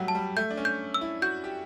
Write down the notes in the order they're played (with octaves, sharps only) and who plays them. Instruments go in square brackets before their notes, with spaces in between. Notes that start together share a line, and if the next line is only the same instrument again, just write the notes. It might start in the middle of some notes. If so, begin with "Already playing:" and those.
Already playing: [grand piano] F#3 G3 A3 [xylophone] F#5
[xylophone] A5
[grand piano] G3
[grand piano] A3 [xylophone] G6
[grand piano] D4
C#4
[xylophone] G6
E6
[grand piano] E4
[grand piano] F#4 [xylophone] G6
[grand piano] G4